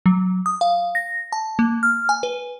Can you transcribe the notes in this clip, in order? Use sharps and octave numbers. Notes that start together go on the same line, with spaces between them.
F#3
D#6
F5
A#6
A5
A#3
F6
G#5
B4